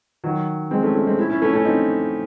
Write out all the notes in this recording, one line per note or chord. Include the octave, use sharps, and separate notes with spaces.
D#3 F#3
G#3 C4
A3 C#4
A3 C#4
G#3 C4
C#4 E4
C#4 E4
A3 C#4
A3 C#4
C4 D#4